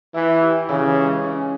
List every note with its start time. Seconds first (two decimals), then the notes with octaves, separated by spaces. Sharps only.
0.14 E3 E4
0.42 G4
0.69 C#3 E3
0.96 G#3
1.23 C#4